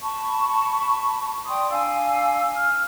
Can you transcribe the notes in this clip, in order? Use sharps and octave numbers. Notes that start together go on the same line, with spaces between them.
A5 B5 C#6
D5 G5 C6 D#6
D4 F5 G#5 E6
F6